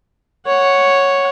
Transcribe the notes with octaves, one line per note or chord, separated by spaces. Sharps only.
C#5 F#5